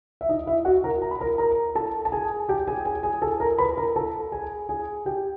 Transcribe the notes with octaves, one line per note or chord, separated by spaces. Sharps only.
E5
D#4 D#5
E4 E5
F#4 F#5
A#4 A#5
A#5
B5
A#4 A#5
A#4 A#5
A4 A5
A5
G#4 G#5
G4 G5
G#4 G#5
G#4 G#5
G#4 G#5
A4 A5
A#4 A#5
B4 B5
A#4 A#5
A4 A5
G#4 G#5
G#4 G#5
G4 G5